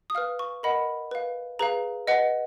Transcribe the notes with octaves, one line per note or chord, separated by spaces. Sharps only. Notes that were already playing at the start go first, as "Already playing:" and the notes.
D#6
B4 F5 F6
C#6
A#4 D#5 F#5 B5
B4 F5
G#4 B4 F5 A#5
B4 D#5 F#5